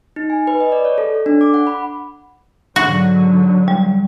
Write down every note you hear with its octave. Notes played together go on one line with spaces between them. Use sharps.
D#4
G#5
B4
D#5
D5
C#5
A4
A4
D4
D6
F#5
B5
G#2 D3 F#3 F#4
G3